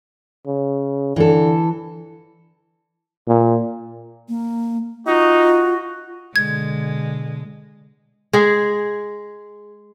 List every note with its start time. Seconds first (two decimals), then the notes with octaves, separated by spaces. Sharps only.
0.47 C#3
1.16 D3 E3 A4
3.28 A#2
4.29 A#3
5.07 D#4 F4 F#4
6.36 B2 D3 G#3 G#6
8.33 G#3 G#4